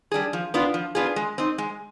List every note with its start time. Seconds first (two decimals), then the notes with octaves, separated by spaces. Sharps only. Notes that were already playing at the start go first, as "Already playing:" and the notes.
0.11 G3 D4 G#4
0.33 F3
0.54 B3 D4 F4
0.74 F3
0.95 B3 D4 F4 G#4
1.16 G#3
1.38 C4 D#4
1.58 G#3